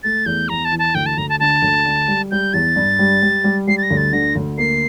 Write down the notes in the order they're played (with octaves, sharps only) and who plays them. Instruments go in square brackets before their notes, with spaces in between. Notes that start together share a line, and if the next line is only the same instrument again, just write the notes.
[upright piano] A3 [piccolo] A6
[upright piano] E2 [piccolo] G6
[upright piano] E2 [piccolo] A#5
[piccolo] A5
[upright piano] E3
[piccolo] A5
[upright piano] D2 [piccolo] G5
[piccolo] A5
[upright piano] D2 [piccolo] A#5
[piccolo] A5
[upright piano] D3 [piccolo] A5
[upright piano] D2
D3
G3
[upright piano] G3 [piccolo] G6
[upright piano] E2 [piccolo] A6
[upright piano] G2
G3
G3
G3
[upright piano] G3 [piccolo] C7
[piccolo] A6
A#6
[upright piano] D2
[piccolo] A6
[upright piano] D3 [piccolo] A#6
[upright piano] D2
[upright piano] A#3 [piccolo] C7